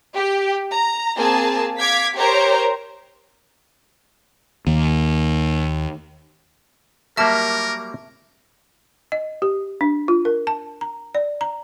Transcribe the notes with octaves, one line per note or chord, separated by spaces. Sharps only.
G4
A#5
A#3 C4 G#4 G#5 A5
F5 D6 G#6 B6
G4 A#4 C5 C#5 A#5
D#2
F#3 G3 A#3 A#4 E5 A5
D#5
G4
D4
F4
A#4
A5
A#5
D5
A#5